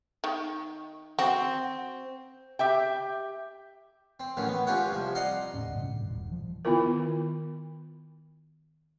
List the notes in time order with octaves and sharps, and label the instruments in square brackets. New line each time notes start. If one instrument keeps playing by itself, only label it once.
[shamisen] D#3
[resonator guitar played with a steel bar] C4 [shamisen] F#4
[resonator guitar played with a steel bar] G4 E5 G5
[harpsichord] C4
A1 D#3 F#3 C#4
B3
G#3 F4 G4 C#5 F#5
C2 F3
D5 D#5 F5 F#5 A#5 C6
[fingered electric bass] D#1 D2 A2 C#4
G2 C3 D#3
F#2 A2
D#1
F3
[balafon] D#3 B3 E4 F4 A#4